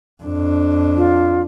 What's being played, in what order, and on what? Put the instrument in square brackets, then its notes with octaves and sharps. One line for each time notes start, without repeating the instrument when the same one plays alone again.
[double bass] F2 D4
[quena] F4